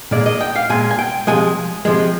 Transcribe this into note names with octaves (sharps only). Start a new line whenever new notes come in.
A#2 G#3 D5
D#5
G5
F5
A#2 G#3 G#5
G#5
G5
C3 F3 G#3 G#5
C3 F3 G#3